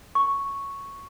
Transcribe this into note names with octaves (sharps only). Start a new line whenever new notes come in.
C#6